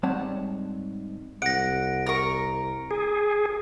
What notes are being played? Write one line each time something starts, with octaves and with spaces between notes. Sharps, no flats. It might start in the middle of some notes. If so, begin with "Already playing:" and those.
G#2 G3 C4 C#5 F#5 A5
C2 F#5 A#6 D7
A#4 C#6
G#4